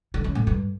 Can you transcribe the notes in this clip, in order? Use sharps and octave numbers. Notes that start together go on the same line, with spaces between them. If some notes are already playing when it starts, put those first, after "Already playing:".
D3
C#3
A2
G2